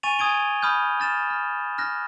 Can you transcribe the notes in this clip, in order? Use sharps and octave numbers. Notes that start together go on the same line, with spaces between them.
G#5 C#6 A6 D#7 F7
G#5 D#6 G#6 D7 G7
B5 D#6 F6 G6
F6 A6 E7
F6
F6 F#6 A#6